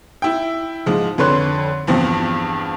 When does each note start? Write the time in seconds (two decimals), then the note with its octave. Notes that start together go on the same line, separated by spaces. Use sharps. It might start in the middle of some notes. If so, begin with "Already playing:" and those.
0.22 E4 G5
0.86 G#2 F3 G#3
1.18 F2 D3 B4 C#5 C6 F#6
1.87 E2 G2 F3 C4